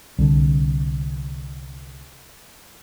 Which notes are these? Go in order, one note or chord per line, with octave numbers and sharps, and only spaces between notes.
C2 D3